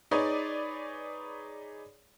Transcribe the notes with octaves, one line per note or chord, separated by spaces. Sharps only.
D#4 G#4 B4 C#5 D5